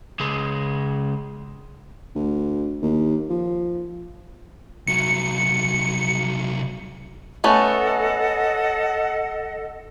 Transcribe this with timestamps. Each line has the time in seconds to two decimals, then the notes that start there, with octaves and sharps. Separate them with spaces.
0.20 C#2 G#3
2.15 D2
2.82 D#2
3.29 F3
4.87 C2 F#3 C#7
7.44 A3 B3 C#4 A4 D#5 F#5